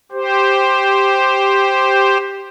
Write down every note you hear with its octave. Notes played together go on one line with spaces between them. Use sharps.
G4 C5